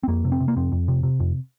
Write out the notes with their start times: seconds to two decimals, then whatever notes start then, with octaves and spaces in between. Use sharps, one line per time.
0.03 C4
0.08 F2 A#3
0.25 C3
0.32 C4
0.40 C3
0.48 A#3
0.56 F2 C4
0.72 F2
0.88 C3
1.03 C3
1.20 F2